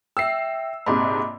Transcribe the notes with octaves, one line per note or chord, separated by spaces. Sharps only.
E5 G5 E6 C7
A#1 G#2 C3 B5 C6 D6